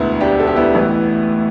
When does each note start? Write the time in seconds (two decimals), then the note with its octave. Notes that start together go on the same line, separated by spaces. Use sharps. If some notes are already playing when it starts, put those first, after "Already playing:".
Already playing: E1 D2 D3 B3 E4
0.20 D4 G4
0.39 A4
0.47 G4
0.56 B3 E4
0.74 A1 A2 E3